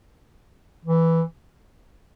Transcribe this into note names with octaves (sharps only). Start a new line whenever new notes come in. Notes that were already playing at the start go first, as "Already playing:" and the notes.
E3